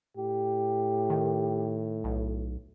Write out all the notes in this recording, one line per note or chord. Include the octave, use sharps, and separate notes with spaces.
A2 G4
D#3
B1